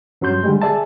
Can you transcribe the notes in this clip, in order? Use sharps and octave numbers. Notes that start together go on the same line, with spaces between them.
G2 F#3 C#4 C6 G6
D3 G3 G#3
G#4 D5 E5 A5